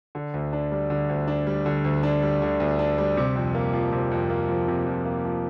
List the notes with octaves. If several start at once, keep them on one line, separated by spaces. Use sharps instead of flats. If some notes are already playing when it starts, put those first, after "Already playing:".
D3
D2
D4
G3
D3
D2
D4
G3
D3
D2
D4
G3
D3
D2
D4
G3
C3
F2
A#3
F3
C3
F2
A#3
F3
C3
F2
A#3
F3